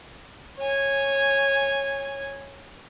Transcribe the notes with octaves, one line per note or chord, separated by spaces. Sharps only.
C#5 G#5